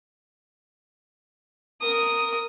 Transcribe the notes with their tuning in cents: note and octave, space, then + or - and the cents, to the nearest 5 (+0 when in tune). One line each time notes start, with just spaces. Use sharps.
A#4 -5 D#6 +0